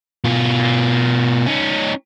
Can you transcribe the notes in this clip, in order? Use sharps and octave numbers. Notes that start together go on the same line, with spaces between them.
B2 F4
C#4 D#4